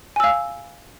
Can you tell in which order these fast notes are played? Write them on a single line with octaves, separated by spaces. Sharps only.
G#5 E6 F5